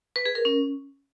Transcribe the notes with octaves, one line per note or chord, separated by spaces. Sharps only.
B4
G#4
A#4
C#4